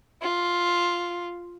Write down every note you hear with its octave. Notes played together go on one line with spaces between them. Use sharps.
F4